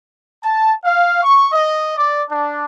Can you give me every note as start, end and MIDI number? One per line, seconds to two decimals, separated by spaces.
0.42 0.72 81
0.83 1.19 77
1.22 1.48 85
1.52 1.93 75
1.96 2.21 74
2.29 2.64 62